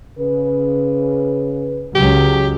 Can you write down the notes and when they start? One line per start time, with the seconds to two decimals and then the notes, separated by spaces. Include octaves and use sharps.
0.19 C#3 B4
1.95 C#2 C#3 F#3 G4